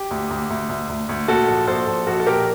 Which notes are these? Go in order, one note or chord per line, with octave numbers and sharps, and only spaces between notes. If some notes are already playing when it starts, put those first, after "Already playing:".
Already playing: G4
D2
D2
D2
D2
D2
D2
A#2 F#4 A4
A#1
A#1 A4 C5
A#1
A#1 F#4 A4
A4
A#2 G4 A#4